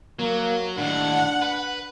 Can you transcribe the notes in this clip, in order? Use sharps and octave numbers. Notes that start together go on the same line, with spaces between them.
F#3 A#3
D#2 A2 D4 F#5
B4